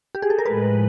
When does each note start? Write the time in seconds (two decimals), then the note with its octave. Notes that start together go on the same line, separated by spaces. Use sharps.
0.15 G4
0.22 G#4
0.30 A4
0.39 A#4
0.46 A2 F3 G#3 B4